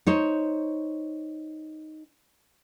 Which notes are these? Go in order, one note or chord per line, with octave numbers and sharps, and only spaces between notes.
D#4 C5 C#5